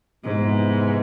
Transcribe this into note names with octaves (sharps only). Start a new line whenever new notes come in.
F2 G#2 C3 E3 G#3 B3